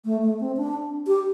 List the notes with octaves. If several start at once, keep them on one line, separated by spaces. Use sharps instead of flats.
A3
A3
C4
D4
G4